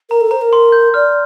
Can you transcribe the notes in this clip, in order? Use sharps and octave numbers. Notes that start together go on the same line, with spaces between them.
A#4 A#5
A4
C5 A#5
A#4
C6
G6
D5 F6